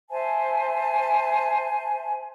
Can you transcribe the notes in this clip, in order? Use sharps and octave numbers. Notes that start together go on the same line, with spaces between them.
C5 E5 G#5 A5